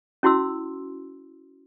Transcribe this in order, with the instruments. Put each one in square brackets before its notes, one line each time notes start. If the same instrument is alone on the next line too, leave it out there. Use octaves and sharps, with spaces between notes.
[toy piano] C#4 E4 F#4 C6 E6